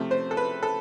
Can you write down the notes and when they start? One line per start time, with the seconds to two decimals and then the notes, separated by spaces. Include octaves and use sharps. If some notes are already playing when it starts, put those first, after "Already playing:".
Already playing: C3 F3 A3
0.11 C5
0.31 A4
0.37 B4
0.63 A4